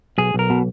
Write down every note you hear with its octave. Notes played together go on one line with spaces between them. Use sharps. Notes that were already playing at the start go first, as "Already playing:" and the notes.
B1 G#4
B1 A#4
B2